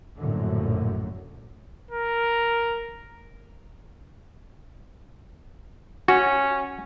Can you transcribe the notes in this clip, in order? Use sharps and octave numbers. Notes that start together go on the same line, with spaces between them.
A#1 F#2 A2 D3
A#4
C#4 F#4